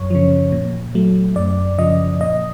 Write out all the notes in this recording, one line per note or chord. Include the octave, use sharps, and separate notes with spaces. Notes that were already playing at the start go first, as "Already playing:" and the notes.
Already playing: F#2 C#5
C#3 F3
A#2
F#3 A3
F#2 D5
C#3 F3 D#5
A#2 D#5